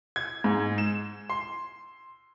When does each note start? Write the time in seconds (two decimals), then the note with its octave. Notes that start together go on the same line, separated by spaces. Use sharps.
0.16 G#6
0.44 G#2
0.78 E7
1.30 C6